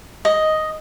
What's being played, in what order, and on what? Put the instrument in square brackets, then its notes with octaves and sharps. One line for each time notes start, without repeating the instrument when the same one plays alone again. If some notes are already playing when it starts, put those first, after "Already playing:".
[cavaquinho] D#5